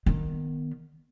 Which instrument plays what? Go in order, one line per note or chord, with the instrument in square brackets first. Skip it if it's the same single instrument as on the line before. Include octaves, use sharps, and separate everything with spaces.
[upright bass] D#3 B3